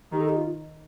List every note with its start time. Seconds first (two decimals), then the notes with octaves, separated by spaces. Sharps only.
0.12 D#3 D#4 G4
0.20 A4
0.29 G4
0.37 F4